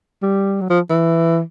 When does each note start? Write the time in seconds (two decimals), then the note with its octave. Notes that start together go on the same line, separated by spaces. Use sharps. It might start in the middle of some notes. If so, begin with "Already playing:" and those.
0.22 G3
0.61 F#3
0.70 F3
0.90 E3